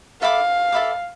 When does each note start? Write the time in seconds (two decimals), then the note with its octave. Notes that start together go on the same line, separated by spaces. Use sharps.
0.21 A4 E5 F5 B5 D6
0.72 A4 E5 B5 D6